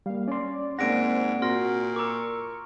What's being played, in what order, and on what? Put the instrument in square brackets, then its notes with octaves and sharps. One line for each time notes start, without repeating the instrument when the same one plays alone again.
[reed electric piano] G3 A#3 [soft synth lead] F5
[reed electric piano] C#4 C6 [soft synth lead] D5
[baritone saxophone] G#2 [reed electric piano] A#3 D5 F#5 [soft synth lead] C4 [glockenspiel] A#6 D7
[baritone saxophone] A#2 [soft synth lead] F#4 [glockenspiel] C6 F6 A#6
[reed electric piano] A#4 E6 [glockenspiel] A#5 D6 [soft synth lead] C#6